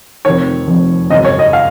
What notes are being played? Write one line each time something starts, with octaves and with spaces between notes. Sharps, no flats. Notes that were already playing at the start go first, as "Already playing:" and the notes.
F1 F2 D#3 C#5
F1 F2 D#3
G#1 F#2 C#3 D#5
C#5
D#5
F5